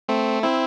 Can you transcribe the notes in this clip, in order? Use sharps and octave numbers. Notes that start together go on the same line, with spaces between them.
A3 C4
C4 E4